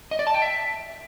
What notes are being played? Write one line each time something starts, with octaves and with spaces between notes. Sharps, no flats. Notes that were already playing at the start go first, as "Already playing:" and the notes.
D#5
D5
A5
G5
E5